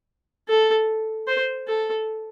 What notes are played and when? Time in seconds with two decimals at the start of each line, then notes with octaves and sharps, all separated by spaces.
0.48 A4
1.27 C5
1.67 A4